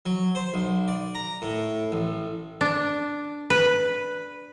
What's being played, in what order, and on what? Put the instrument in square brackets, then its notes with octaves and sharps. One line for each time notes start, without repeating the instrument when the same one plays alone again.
[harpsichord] F#3
C5
B1
D5
A#5
A2
A1
[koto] D4
B4